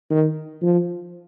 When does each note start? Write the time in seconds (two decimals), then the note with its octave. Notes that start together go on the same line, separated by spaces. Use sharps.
0.10 D#3
0.62 F3